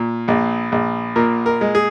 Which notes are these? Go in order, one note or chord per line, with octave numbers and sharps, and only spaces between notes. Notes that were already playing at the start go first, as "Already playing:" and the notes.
Already playing: A#2
A#1
A#1
A#2 A#4
A#4
G#3
G#4